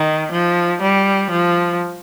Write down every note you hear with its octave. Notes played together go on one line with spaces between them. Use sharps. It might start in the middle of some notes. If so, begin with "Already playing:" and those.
Already playing: D#3
F3
G3
F3